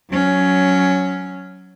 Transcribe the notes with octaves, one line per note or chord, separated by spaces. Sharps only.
F#3 C#4